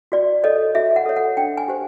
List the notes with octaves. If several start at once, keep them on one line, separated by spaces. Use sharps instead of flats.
F#4 D5
A4 C#5 D#5
F#4 E5
F#5
A4 C#5
F#5
D4 G5
G#5
G4 C5